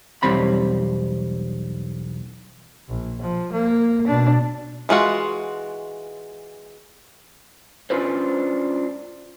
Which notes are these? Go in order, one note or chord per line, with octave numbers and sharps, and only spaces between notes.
B1 E2 G3 C4 B5
A#1
F3
A#3
B2 D4
E3 G#3 F4 F#4
C#4 D4 F4 B4 C5